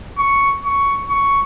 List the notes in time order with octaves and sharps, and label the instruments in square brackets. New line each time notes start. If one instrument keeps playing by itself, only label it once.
[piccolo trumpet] C#6
C#6
C#6